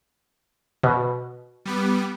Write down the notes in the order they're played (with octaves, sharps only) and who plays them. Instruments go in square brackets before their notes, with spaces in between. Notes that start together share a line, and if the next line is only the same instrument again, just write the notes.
[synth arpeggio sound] B2
[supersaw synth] G3 B3 D6